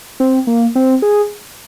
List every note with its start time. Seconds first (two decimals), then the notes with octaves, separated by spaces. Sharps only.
0.20 C4
0.47 A#3
0.75 C4
1.02 G#4